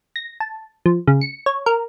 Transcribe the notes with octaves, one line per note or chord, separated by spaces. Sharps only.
A#6
A5
F3
C#3
C#7
C#5
A#4